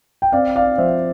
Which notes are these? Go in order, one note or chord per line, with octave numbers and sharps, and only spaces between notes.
G5
C4 D5 F5
D5 F5
F3 C5 E5